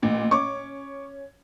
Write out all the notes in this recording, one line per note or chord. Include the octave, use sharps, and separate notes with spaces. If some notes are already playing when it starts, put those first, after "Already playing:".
A1 A#2
C#4 C#6 D6